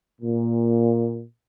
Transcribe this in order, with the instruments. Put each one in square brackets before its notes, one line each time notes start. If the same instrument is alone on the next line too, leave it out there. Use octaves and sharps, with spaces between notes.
[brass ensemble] A#2